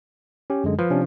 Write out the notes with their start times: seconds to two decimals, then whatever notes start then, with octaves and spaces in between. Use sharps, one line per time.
0.50 C#4 G4
0.64 F#2 D3 G#3
0.79 F3 B4
0.90 C3 C#4 D4